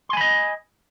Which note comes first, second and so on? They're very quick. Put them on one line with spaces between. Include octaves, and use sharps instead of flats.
C6 G#5 B5 D#5